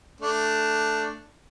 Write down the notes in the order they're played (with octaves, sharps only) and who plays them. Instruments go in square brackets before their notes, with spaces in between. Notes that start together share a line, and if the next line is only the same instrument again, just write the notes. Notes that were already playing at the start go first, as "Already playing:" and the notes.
[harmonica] A3 D4